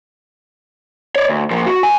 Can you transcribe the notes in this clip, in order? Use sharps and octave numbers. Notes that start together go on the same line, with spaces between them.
C#5 D5
D2
A#2 F3
F#4
F#2 G#5